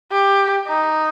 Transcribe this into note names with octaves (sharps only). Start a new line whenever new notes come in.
G4
D#4